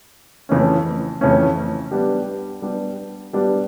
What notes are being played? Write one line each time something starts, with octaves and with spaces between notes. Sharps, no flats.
F2 C#3 E3 A3 C#4
F2 C#3 E3 A3 C#4
G3 B3 D4 G4
G3 B3 D4 G4
G3 B3 D4 G4